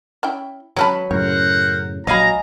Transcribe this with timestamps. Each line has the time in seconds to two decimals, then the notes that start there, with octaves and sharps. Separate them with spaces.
0.23 C#4 E4 G5
0.76 F#3 C4 C#4 B4 A5 B5
1.11 F#2 A2 C#3 A#4 C5 C#5 F#5
2.07 A#1 F#3 C#5 D#5 F5 G#5 A#5 B5